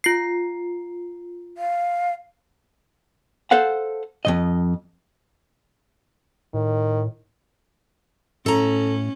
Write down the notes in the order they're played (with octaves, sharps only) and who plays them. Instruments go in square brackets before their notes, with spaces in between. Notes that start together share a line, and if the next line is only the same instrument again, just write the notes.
[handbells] F4 C7
[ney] F5
[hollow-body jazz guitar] A4 C5 F5 F#5
F2 C#3 D#5
[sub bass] A2 [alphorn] D#3
[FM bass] A2 [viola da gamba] C#4 [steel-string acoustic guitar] A4 A#5